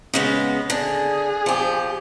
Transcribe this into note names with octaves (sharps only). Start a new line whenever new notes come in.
C#3 G#3 B3
D3 G#4
F3 G4